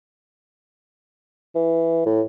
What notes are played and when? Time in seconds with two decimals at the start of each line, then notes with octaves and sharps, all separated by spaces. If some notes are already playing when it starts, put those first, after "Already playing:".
1.55 E3
2.06 A2